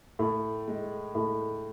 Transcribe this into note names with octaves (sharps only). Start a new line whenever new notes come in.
A2
G#3
A2